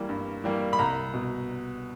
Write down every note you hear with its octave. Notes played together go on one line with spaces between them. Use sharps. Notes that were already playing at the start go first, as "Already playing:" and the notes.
Already playing: E3 G3 A#3
G2
E3 G3 A#3
B5
C2 A#5
B2